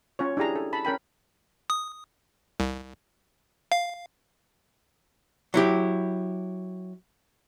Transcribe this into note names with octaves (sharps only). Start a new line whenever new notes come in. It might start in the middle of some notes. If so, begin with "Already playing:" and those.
C#4 F4 C#5
D4 E4 G4 G#4 A#5
A4
A5 B5
C#4 A#4 G5 B5
D#6
C2
F5
F#3 E4 G4